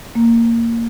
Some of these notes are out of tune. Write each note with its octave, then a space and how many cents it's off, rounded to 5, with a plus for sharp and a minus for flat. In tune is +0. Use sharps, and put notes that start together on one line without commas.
A#3 -15